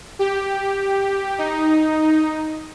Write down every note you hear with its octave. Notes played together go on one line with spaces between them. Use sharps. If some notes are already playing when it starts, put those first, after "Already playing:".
G4
D#4